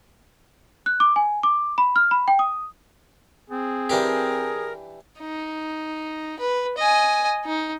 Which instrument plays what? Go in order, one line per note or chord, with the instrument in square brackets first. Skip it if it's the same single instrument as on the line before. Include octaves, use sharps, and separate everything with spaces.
[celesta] F#6
D6
G#5
D6
B5
F6
B5
G5
D#6
[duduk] C4 [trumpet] G#4
[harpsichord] E3 D4 G4 [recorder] A#4
[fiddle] D#4
B4
D#5 G#5
D#4